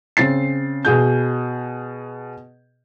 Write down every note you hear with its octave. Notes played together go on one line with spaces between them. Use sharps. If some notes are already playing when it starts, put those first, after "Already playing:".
C#3 C4 A6 C7
B2 G#4 G6